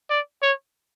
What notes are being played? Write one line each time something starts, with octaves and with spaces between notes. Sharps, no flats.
D5
C#5